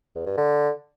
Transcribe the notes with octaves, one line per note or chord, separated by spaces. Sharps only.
E2
G2
D3